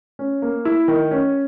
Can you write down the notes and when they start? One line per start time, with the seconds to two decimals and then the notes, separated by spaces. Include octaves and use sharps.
0.19 C#4
0.42 A#3
0.65 E4
0.88 D#3
1.11 C#4